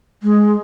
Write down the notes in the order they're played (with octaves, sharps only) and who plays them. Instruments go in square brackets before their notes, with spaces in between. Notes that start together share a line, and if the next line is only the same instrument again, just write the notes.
[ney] G#3